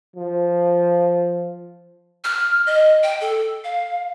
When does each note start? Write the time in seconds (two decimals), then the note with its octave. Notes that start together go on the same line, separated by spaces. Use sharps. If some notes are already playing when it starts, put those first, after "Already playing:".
0.16 F3
2.24 F6
2.67 D#5
3.03 G5
3.21 A4
3.64 F5